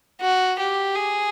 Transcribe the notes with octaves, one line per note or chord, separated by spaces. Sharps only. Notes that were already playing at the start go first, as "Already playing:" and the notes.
F#4
G4
G#4